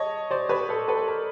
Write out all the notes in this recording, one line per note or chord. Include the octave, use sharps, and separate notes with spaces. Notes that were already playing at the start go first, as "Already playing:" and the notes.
Already playing: C#5 D#5 A5
C5 D5
B4 C#5
A4 B4
A4 B4
A#4